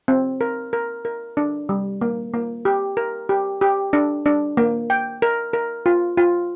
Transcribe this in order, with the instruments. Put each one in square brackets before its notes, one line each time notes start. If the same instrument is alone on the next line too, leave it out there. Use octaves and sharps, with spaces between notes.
[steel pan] C4
A#4
A#4
A#4
D4
G3
A#3
A#3
G4
A#4
G4
G4
D4
D4
A#3
G5
A#4
A#4
F4
F4